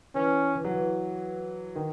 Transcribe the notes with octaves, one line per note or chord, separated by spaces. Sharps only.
E3 C#4
E3
F#3
E3
D#3